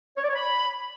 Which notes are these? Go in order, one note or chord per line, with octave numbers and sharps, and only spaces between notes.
C#5
D5
C#5
B5